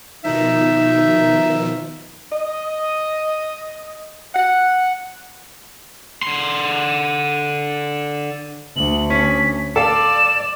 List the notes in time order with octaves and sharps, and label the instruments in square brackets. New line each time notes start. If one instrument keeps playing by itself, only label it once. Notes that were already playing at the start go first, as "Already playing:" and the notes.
[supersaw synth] B2 D#3 F3 [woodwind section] D#4 [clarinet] E5
[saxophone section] D#5
F#5
[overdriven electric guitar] D3 C6
[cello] D2 [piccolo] F#7
[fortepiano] C#4 [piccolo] B6
[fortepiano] A4 F5 [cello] D5 [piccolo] E7